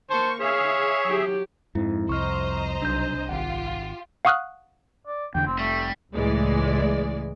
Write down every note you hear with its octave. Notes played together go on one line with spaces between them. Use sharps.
A#3 C5 A5 C#6
G#4 C#5 E5 F5
F#3 G4
F2 G#2 E4
C2 C5 D#5 A#5 C#6 F6
B1 D4 G6
G#1 F4 G4 F#5
F5 F#5 C#6 D#6 F6 F#6
D5
E2 D3 G5
F1 C4
G3 A3
C#2 A2 E3 G#3 D5